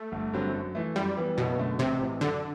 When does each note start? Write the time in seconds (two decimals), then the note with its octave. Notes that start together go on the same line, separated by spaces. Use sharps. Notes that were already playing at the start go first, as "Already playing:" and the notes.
Already playing: A3
0.12 G1
0.33 G2 D3 F#3 C4
0.54 F#2
0.75 E3 A3
0.96 F#2 G3
1.17 E3 B3
1.37 F#1 B2
1.58 F#2 D3 A3
1.79 A1 C3
2.00 A2 E3
2.21 F#2 D3